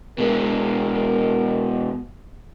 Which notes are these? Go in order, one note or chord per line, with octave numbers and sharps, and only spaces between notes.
B2 G#3 A#4